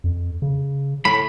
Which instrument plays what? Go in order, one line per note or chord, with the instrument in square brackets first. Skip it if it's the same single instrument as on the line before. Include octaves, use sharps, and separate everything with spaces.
[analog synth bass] F2
C#3
[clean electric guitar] A2 B5